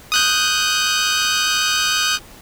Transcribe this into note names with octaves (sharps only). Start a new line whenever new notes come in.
D#6 F#6 G6